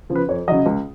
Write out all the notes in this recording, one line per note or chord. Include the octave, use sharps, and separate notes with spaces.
C#3 F3
B4
F2 C#5
C#3 F#3 D#5
C#2